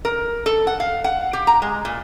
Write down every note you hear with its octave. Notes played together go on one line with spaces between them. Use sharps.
A#4
A4
F#5
F5
F#5
G4
A#5
G#3
A#2